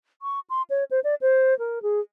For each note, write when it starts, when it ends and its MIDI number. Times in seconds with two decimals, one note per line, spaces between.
0.22 0.40 85
0.50 0.62 84
0.70 0.84 73
0.91 1.00 72
1.04 1.15 74
1.21 1.57 72
1.59 1.82 70
1.82 2.00 68